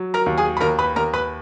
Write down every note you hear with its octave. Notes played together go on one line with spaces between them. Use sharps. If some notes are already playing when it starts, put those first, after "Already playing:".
Already playing: F#3
A#4 A#5
D#2
G#4 G#5
B5
D#2 A#4 A#5
B4 B5
D#2 A#4 A#5
B4 B5